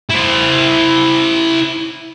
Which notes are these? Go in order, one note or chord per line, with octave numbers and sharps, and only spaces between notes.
E4 C5